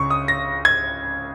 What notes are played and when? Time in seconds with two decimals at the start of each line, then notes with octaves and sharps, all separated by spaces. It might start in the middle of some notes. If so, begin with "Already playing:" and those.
Already playing: C#2 C#3 C#6
0.10 D#6
0.28 A#6
0.65 G#6